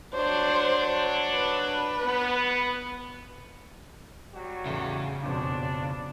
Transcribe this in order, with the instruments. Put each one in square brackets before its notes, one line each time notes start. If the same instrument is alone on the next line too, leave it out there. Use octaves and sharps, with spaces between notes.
[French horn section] F#3 D4 C#5 [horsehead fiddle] C5
[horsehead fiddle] B4
[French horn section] B3
[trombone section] F#3 G3 F#4
[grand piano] E2 A2 [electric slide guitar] C#3
[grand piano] A#1 F2 B2 [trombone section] D4